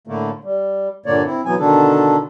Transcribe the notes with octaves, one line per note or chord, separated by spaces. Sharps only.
A2 D3 A3 A#3
G3
G2 A#2 D3 A#3 C#5 D5
C4 E4
B2 E3 F#3 B3 G#5
B2 D3 D#3 D4 A4